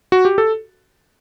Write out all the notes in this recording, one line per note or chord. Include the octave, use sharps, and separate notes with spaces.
F#4
G4
A4